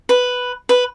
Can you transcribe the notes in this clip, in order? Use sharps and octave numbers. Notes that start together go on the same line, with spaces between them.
B4
B4